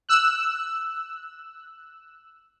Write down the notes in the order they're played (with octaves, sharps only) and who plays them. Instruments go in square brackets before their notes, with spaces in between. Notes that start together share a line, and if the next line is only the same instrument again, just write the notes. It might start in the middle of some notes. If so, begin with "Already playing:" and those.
[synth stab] E6 F#6